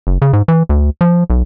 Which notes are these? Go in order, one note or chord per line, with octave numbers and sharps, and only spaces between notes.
F#1
C#3
G#2
E3
D2
F3
B1